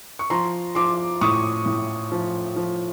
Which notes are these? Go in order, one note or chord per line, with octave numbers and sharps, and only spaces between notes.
C#6
F3 A#5 C6
F3 C6 D6
A2 C#6 D#6
A2
F3
F3